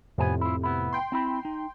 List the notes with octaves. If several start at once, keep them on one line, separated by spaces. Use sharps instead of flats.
F2 A2 C3 B3 G#5
E4 F4
B3 E4
G5 C6
C4 E4 B5
D#4